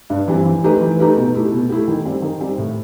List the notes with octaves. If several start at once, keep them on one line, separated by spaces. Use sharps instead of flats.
G2
E3 G3 C4
E3
A3 D#4 G4 B4
E3
A3 D#4 G4 B4
B2
A3 E4 G4
B2
A3 E4 G4
D#3
G3 C4
D#3
G3 C4
A2